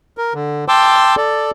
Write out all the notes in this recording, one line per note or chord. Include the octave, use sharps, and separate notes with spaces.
A#4
D3
G5 A5 C6 D6 E6
A4 D5